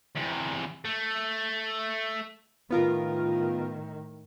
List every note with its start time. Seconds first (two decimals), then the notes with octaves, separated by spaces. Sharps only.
0.16 E2 C3
0.85 A3
2.71 A2 D#3 B3 F4 A#4